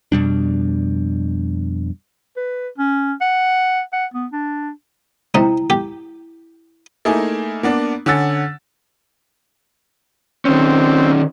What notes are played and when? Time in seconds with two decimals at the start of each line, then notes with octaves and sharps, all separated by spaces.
0.12 F2 B2 G3 D4
2.37 B4
2.78 C#4
3.21 F#5
3.93 F#5
4.14 B3
4.32 D4
5.34 C3 D#4 E4 G5 A#5
5.70 G4
7.05 A3 A#3 D#4 E4 G#4
7.63 A#3 B3 D4
8.06 D3 C#4 F#5 E6 A6
10.45 D#3 C4 C#4